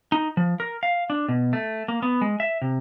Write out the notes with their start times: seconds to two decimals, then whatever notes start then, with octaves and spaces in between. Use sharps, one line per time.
0.12 D#4
0.37 F3
0.60 A#4
0.83 F5
1.10 D4
1.29 B2
1.53 A3
1.88 A#3
2.02 B3
2.21 G#3
2.40 E5
2.62 C3